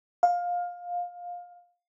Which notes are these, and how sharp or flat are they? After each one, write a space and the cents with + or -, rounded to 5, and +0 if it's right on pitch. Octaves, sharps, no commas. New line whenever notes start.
F5 +20